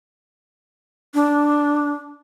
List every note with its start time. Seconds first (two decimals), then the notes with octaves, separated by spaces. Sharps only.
1.14 D4